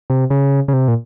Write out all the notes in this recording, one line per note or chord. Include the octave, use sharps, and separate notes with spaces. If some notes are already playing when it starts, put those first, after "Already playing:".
C3
C#3
C#3
C3
A#2